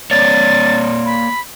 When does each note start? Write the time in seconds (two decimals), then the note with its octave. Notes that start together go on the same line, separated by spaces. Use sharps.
0.11 A#3 C#5 D5 A6
1.06 B5